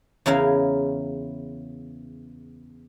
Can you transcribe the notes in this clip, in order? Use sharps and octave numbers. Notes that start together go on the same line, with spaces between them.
E2 C#3 E4 A#4 F5